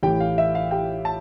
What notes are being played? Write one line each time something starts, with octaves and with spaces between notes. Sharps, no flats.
A1 A2 E3 G4 G5
F5
E5
F5
G4 G5
A5